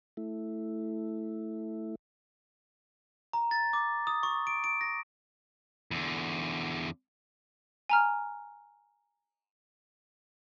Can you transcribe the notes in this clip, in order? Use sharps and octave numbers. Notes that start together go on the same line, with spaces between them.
A3 E4
A#5
A6
D6
D#6
C#6
D7
D7
A#6
E2 D3
G#5 A#5 F6